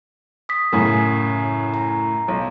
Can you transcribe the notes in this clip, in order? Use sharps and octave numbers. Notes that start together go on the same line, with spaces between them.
D#6 B6
F#2 A2 C#3
A#5
B1